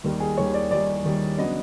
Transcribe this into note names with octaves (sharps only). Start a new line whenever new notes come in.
D#2 D#3 G3
G#4
D#2 D#3 G3 C#5
D5
D#2 D#3 G3 D5
D#2 D#3 G3
C#3 F#3 B3 D4 D#5